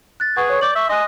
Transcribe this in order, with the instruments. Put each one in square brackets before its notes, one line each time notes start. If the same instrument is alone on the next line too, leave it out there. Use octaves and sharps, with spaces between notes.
[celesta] F#6 A6
[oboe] G#4 [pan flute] B4 [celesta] F#5 C#6
[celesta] C#5 C#6
[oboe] D5 [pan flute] D6 [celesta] G6 F#7
[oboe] E5 [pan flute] C#6
[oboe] D#5 [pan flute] G#5 [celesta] C6 D#6 F#6